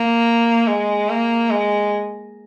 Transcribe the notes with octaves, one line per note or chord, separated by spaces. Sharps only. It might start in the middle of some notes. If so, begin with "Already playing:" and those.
Already playing: A#3
G#3
A#3
G#3